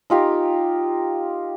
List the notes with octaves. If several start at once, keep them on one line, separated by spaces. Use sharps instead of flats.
D#4 F4 G4 A#4